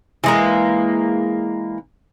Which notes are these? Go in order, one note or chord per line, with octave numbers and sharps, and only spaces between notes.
E3 G#3 A#3